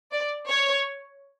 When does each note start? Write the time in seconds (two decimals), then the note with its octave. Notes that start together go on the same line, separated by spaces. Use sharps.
0.12 D5
0.49 C#5